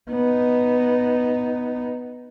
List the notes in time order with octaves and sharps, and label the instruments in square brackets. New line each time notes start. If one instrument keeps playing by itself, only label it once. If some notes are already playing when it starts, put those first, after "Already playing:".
[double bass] B3 D#4